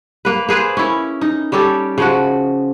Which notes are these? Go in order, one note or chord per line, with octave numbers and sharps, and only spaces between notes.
A#3 B4
A#3 G#4 B4 C5
C#4 E4
D#4
G3 C#4 G4 A4
C#3 F3 F#4